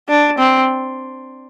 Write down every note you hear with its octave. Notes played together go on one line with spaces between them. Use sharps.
D4
C4